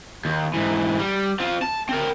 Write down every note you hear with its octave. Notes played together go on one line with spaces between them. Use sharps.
D#2
G#2 E3
G3
C4 F4
A5
C4 A#4